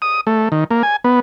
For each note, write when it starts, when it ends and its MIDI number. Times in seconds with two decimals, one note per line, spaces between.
0.02 0.21 87
0.27 0.49 57
0.52 0.64 51
0.71 0.83 58
0.83 0.96 80
1.04 1.20 59